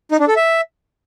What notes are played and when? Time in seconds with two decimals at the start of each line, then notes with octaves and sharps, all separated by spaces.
0.12 D#4
0.20 D4
0.28 A4
0.36 E5